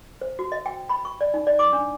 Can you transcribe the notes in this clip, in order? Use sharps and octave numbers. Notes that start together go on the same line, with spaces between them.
C5
F#4
D#5
G5
B5
C#6
D5
D#4
D5
D6
D4